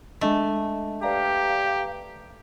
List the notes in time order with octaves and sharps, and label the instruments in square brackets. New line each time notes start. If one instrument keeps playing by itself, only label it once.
[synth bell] G#3 D4 D#5 [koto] A3
[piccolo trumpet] G4 [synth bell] B4 D5 A#5 [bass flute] F5